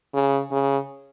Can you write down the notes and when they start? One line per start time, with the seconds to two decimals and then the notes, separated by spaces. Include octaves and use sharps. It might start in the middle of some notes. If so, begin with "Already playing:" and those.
0.14 C#3
0.52 C#3